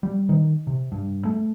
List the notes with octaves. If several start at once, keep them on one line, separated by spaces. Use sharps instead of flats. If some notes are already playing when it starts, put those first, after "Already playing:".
G3
D#3
C3
G2
A3